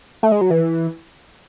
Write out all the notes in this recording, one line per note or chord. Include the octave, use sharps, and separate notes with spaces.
A3
G#3
F#3
E3